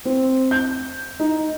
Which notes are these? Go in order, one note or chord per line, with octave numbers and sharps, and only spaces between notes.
C4
G6
D#4